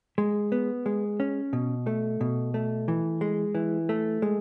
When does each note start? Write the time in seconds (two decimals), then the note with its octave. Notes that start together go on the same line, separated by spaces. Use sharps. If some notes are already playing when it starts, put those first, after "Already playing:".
0.18 G#3
0.52 B3
0.86 G#3
1.20 C#4
1.53 B2
1.87 A3
2.21 B2
2.54 A3
2.88 E3
3.21 G#3
3.55 E3
3.89 A3
4.22 G#3